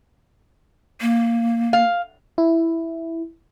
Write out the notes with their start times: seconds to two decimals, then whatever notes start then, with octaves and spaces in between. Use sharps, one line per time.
1.01 A#3
1.73 F5
2.38 E4